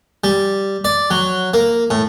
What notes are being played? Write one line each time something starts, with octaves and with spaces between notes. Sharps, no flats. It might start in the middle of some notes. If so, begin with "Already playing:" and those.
G3
D5
F#3
A#3
A2